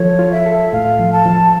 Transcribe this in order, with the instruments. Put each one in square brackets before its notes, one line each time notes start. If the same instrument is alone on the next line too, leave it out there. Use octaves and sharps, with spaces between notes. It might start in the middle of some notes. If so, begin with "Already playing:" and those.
Already playing: [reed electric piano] F3 A4 [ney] C#5
[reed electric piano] F4
[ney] E5
[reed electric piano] A4
[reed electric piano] A2 [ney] F5
[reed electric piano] F3
[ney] A5
[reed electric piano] F3